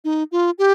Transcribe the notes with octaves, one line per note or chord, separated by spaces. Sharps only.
D#4
F4
G4